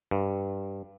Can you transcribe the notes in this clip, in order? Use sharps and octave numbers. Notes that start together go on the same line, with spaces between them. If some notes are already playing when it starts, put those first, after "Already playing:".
G2